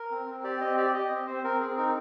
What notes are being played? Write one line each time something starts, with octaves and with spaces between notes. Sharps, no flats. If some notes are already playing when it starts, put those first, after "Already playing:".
Already playing: A#4
C4
C4
G4 D5
C4 D#5
G4 D5
G4 D#5
C4
C4 C5
C4 A#4
C4 G#4
D#4 A#4